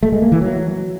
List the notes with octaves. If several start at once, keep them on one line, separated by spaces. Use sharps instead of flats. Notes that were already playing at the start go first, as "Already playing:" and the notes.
A3
G#3
A#3
E3
F#3